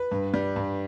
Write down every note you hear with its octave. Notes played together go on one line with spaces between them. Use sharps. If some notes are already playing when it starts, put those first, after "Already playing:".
Already playing: B4
G2
G3
G2